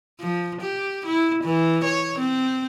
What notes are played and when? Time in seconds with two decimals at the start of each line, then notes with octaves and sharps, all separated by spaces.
0.20 F3
0.61 G4
1.06 E4
1.44 E3
1.84 C#5
2.19 C4